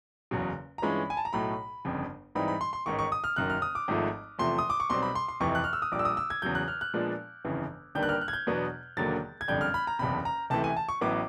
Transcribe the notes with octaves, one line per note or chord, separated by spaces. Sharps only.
F#1 E2 C#3 F#3
A#5
G2 E3 G#3 C#4 F4 B5
G#5
A5
A#5
B1 A2 F#3 A3 B5
G1 F2 C#3
G#2 E3 G3 C4 D#4 B5
B5
C6
C6
A1 G#2 D#3 C#6
C#6
D#6
F6
F#1 F#2 D#3 F#6
F6
D#6
D6
G#1 G#2 F3 A3
E2 C3 F3 A3 C6
D#6
D6
C#6
B1 B2 G3 C4 C6
B5
C6
C6
F1 F2 C3 E3 C#6
F#6
F6
E6
D#6
A#1 A#2 G3 D6
E6
D#6
E6
G#6
E2 C#3 F#3 G6
F#6
F6
F#6
A#2 F3 G#3 B3 D4
G1 F2 C#3 E3
G1 G2 D#3 G3 A#3 G6
F#6
F6
F#6
G#6
G6
E2 B2 F#3 B3 D4
E1 D#2 D3 F#3 A#3 A6
G#6
F#1 F2 D3 G3 G6
F6
B5
A#5
F#1 E2 C3 B5
A#5
C#2 C3 E3 A3 A5
G#5
A5
C#6
A1 A2 F#3 B3 E4 D6